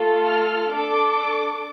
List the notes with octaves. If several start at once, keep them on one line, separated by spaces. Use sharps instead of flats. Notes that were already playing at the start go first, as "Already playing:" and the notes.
Already playing: A3 F4 A4
F6
D4 A4 D6